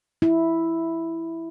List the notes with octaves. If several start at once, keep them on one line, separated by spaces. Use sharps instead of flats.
E4